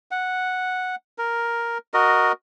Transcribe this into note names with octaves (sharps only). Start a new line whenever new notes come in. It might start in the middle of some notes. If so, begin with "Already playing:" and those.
F#5
A#4
F#4 A#4 D#5